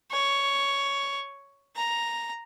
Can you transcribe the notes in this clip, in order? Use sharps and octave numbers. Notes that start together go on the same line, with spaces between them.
C#5
A#5